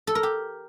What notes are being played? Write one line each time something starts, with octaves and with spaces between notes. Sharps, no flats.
A4
A#4
G4